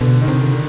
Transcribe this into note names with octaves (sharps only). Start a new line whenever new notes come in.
B2 D3
D#3
C3
D3
D3